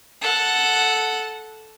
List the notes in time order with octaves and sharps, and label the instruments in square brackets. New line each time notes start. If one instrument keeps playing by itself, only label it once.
[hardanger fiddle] A4 F#5